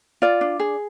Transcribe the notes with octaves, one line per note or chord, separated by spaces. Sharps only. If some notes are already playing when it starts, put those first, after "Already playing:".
F4 D5
D4
G#4